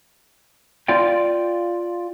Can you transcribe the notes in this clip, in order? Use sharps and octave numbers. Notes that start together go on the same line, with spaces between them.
F4 D5 G5